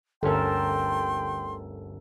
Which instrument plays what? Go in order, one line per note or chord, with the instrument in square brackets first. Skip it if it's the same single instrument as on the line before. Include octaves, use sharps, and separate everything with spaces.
[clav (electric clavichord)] G1 D2 C#4 [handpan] A4 A#4 [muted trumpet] G5 [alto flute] C6